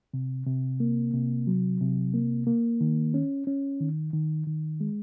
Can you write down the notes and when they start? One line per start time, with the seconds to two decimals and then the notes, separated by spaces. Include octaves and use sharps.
0.14 C3
0.47 C3
0.80 A#3
1.14 C3
1.47 F#3
1.81 C3
2.14 A#3
2.47 A#3
2.81 D#3
3.14 C#4
3.47 C#4
3.80 D#3
4.13 D#3
4.46 D#3
4.80 G#3